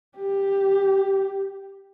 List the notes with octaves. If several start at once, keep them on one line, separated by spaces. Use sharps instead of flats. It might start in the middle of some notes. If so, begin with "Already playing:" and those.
G4